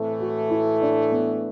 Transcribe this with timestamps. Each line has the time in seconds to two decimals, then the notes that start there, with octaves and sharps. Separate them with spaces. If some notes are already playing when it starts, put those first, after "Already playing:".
Already playing: A2 E3 A3 C4
0.20 F#4
0.50 E4
0.81 D4
1.12 B3